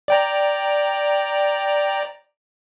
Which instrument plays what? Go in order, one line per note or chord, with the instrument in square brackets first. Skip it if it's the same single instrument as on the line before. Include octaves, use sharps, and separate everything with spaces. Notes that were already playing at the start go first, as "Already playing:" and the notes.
[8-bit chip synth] D5 G5 A#5